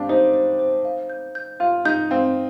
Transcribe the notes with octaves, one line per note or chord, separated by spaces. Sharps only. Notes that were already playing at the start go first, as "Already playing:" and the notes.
Already playing: G3 C4 D4 F5
D#4 C5
C5
C5
F5
G6
G6
F4 F5
D#4 G6
C4 F5